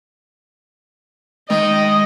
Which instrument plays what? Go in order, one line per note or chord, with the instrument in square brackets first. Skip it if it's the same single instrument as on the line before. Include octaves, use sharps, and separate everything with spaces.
[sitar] D#3 [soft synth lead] G#3 [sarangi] D#5